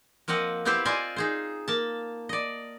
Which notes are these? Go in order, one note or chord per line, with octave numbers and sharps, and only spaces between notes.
F3 A#3 C4 D#5 F#5
B3 C4 E4 G4 B4 C5
F4 C5 D5 D#5 G#5
D#4 G#4 C5
A#3 A5
D5 D#5